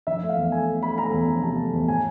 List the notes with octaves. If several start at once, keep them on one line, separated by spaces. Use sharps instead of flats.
F3 E5
A3
F5
E2
A3 G#5
A3
A3 B5
A3 A#5
E2
F3
C3 A5
A3
E2
A2 G#5